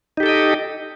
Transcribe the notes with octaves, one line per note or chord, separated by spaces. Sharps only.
D#4 G4 A4 D#5 G5